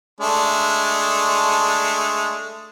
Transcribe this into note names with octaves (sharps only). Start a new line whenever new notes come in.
G#3 A3 D4